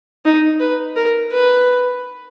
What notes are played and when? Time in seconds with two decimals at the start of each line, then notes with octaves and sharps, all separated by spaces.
0.25 D#4
0.60 B4
0.96 A#4
1.32 B4